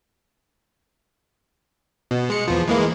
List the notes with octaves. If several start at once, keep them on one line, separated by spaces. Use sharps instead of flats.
B2
G#3 C#7
E2 F3
E3 G#3 A#3